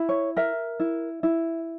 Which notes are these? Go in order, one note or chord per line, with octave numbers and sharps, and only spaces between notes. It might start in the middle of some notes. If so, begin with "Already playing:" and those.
Already playing: E4
C#5
A#4 E5
E4
E4